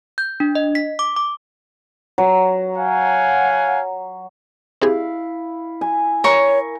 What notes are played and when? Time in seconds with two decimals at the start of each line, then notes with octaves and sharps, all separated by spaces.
0.18 G6
0.40 D4
0.55 D#5
0.75 B6
0.99 D6
1.16 D6
2.18 F#3
2.77 F5 F#5 G#5
4.82 C4 E4 G4 G#4 F5
5.81 G#5
6.24 A#4 C#5 C#6